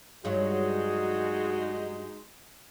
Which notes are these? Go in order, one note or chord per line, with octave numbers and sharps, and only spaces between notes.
G2 F#3 G#3 D#4 F#4 G#4